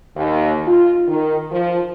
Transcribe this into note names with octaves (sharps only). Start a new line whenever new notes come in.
D#2
F4
D#3
F3